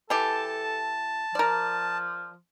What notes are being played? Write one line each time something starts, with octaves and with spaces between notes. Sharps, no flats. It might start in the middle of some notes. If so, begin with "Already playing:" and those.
E3 G4 A4 A5
F3 A#4 D5